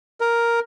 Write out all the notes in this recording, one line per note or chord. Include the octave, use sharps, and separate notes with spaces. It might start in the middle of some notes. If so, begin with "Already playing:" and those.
A#4